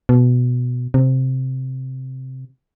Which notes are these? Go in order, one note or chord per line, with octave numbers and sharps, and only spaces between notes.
B2
C3